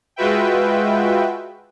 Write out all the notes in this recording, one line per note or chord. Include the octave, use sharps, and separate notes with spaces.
G#3 F4 F#4 B4 E5 G5